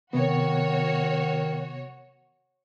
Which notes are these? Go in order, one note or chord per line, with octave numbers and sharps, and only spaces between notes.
C3 D#3 B3 F#4 C#5